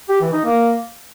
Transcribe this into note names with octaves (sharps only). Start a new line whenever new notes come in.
G4
E3
D#4
A#3